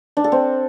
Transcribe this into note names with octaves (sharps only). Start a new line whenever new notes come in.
D4
A4
C4